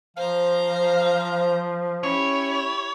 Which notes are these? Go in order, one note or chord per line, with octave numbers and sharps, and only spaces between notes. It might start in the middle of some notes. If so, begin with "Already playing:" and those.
F3 C5 F5 A#5
C#4 E4 G4 C#5